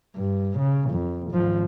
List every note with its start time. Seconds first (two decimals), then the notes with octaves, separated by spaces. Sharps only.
0.16 G2
0.58 C#3
0.90 F2
1.32 G#1 F3